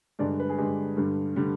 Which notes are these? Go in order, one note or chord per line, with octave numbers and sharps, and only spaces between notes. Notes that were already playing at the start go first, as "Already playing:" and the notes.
G2 D3 G#3 D5
B4
G#4
G2 D3 G#3 G4
G2 D3 G3
D3 G3